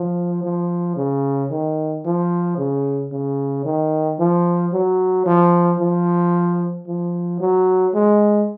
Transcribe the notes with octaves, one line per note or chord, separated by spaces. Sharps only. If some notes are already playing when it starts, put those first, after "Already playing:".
Already playing: F3
F3
C#3
D#3
F3
C#3
C#3
D#3
F3
F#3
F3
F3
F3
F#3
G#3